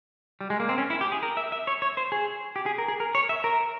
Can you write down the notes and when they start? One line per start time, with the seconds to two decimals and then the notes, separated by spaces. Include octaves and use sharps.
0.41 G3
0.50 G#3
0.60 A#3
0.69 C4
0.78 C#4
0.90 E4
1.01 G4
1.12 G#4
1.23 A#4
1.37 E5
1.52 E5
1.67 C#5
1.82 C#5
1.97 C5
2.12 G#4
2.56 G4
2.66 G#4
2.78 A#4
2.88 G#4
3.00 A#4
3.15 C#5
3.29 E5
3.44 A#4